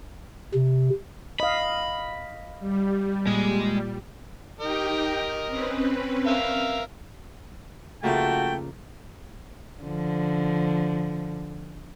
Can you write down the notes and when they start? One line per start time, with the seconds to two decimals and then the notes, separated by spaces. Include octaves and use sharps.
0.54 C3
1.40 D#5 F5 B5
2.59 G3
3.27 A#2 G#3
4.61 D#4 G4 A#4 D#5 G5
5.48 C4 C#4 B4
6.26 A#4 E5 F5
8.04 C#3 F3 A3 A#3 F#4 G5
9.83 D3 F3